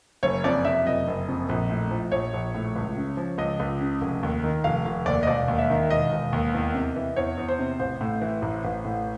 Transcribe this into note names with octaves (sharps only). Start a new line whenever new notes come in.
F#1 C#5
F2 D5
C3 E5
F#1 D#5
F#1
F2
A#1
A2
F3
A#1 C#5
A#1
A2
C#2
C#3
F3
C#2 D#5
C#2
C#3
F1
D#2
D#3
F1 F5
F1
D#2 D5
D#5
E1 D5
D#2
E5
D#3
E1 D#5
E1
D#2
E2
C3
E3
E2 C#5
E2
C5
C3
A1 C5
A2
E3
A1
A1
A2